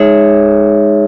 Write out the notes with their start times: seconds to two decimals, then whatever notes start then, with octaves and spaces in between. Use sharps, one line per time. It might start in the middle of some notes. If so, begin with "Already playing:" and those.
Already playing: G#3 D#4 G#4 C#5 E5